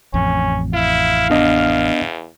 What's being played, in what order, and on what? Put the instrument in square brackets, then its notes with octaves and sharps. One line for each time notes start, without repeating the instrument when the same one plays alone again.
[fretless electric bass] A1 F2 [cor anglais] C#4
[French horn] E4 [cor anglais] F5
[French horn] E2 [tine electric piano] B3 D4 D#5